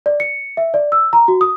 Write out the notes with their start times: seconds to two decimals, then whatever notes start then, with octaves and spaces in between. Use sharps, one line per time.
0.06 D5
0.20 C#7
0.57 E5
0.74 D5
0.92 E6
1.13 A#5
1.28 F#4
1.41 D#6